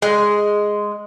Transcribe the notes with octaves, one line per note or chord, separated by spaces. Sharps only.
G#3